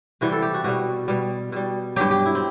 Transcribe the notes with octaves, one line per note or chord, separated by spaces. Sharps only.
C3 E3 G3 F#4
A4
G4
F#4
B2 G3 F#4
B2 G3
B2 G3
G2 F#3 G4
G4
E4
C4